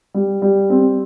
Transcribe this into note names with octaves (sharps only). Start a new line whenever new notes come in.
G3
G3
C4